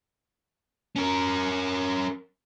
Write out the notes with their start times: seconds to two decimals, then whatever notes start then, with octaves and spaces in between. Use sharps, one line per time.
0.96 C#4 A#4